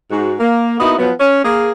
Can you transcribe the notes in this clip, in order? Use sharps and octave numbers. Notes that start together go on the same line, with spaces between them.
G#2 F#4
A#3
A#3 B3 D#4 E4 F#4
F3 F#3 B3
C#4
A#3 G#4